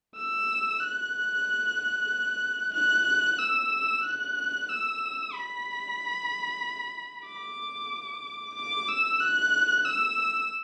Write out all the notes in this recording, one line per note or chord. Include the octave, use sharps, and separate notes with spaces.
E6
F#6
F#6
E6
F#6
E6
B5
D6
D6
E6
F#6
E6